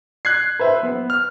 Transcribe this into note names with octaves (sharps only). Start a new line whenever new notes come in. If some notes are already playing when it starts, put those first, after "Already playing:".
F#6 G#6 C7
B4 C5 E5
B3
F6